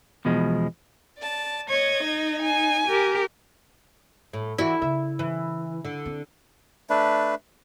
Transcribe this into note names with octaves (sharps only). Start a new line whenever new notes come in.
E2 B2 F3 G#3
D5 A5
C#5 D#5 G#6
D#4
G#5
G4 A#4
A2
E3 E4 F#4 D5
C#3 E5
E3
D3
C4
A3 D4 B4